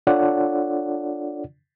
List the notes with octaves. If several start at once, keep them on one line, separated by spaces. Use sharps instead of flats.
D4 F4 A4 C#5 D5 F#5